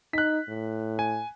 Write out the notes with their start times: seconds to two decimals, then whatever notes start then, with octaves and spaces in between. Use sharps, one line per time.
0.13 D#4 F#6 B6
0.49 A2
0.99 G#5